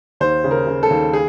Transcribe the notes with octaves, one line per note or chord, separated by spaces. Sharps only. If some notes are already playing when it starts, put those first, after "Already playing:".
D#2 C5
C#3
A#4
C#3
A4
D#2
G#4